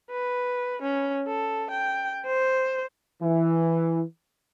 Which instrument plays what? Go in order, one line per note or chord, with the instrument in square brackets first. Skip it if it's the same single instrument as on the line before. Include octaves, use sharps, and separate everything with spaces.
[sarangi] B4
C#4
A4
G5
C5
[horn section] E3